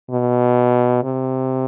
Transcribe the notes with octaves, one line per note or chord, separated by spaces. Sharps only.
B2
C3